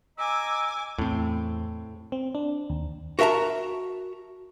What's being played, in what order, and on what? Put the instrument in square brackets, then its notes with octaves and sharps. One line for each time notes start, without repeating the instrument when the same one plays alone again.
[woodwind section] D#5 A#5 E6 [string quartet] G#5 D6
[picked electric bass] E2 C4 [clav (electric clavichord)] A2
[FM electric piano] C4
D4
D#2
[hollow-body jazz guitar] F#4 A#4 E5 A5 A#5